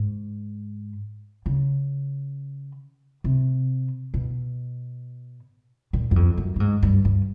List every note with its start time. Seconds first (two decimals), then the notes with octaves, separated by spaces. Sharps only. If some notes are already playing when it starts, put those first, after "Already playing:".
Already playing: G#2
1.46 C#3
3.24 C3
4.14 B2
5.93 A#2
6.11 F#2
6.16 F2
6.37 F#2
6.56 A2
6.60 G#2
6.83 G2
7.05 G2